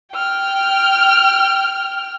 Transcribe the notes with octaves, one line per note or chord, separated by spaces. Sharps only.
G5 F6